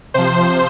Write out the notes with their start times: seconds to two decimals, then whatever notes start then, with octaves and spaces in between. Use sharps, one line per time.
0.14 C3 F3 C5